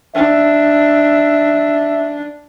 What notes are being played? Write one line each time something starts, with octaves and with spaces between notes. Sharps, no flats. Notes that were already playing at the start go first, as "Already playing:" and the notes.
D4 E5